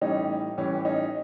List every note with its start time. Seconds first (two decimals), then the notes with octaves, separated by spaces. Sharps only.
0.01 A2 E3 G3 C#4 D#4
0.57 A2 E3 G3 C#4
0.85 C#4 D#4